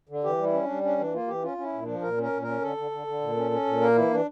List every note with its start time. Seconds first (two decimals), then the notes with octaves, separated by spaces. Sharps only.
0.09 D3
0.24 E3 G4
0.38 G3
0.43 E4
0.53 C#4
0.64 G3 D4
0.83 C#4 D4
0.98 E3 D4
1.13 A#3 F4
1.27 E3 G4
1.43 C#4 F4
1.57 C#4
1.63 E4
1.73 A#2
1.82 F3 D4
2.02 A#2 A#4
2.18 C#4 A#4
2.33 A#2
2.42 C#4 A#4
2.62 D3 A4
2.77 D3
2.91 D3
3.07 D3
3.21 A#2
3.36 C#4
3.51 C#4
3.66 A#2
3.81 A#3 A#4
3.96 E3 E4
4.11 E3 D4